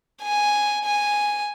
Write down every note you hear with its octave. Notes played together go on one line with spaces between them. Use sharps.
G#5
G#5